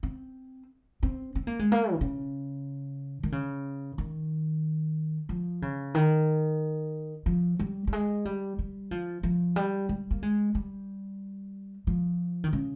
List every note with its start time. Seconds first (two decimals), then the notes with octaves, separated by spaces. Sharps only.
0.03 C4
1.03 C4
1.35 C4
1.47 A#3
1.59 G#3
1.72 A#3
1.93 D#3
2.01 C#3
3.23 D#3
3.32 C#3
3.98 D#3
5.29 F3
5.62 C#3
5.94 D#3
7.26 F3
7.59 G3
7.87 G3
7.93 G#3
8.25 G3
8.59 G3
8.91 F3
9.23 F3
9.56 G3
9.89 G3
10.11 A#3
10.23 G#3
10.55 G3
11.87 F3
12.44 D#3
12.53 C#3